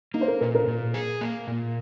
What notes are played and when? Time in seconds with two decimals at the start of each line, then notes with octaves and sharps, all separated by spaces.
0.14 A#3 D#4
0.21 C5
0.28 A#4
0.41 A#2 A#4
0.55 A#4
0.67 A#2
0.94 G#4
1.21 A#3
1.48 A#2